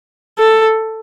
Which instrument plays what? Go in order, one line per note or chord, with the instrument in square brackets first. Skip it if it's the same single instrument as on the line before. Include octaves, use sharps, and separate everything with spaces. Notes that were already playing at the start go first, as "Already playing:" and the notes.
[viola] A4